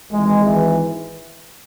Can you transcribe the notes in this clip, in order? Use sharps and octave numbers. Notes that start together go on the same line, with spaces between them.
G#1 G#2 E3 G#3
E3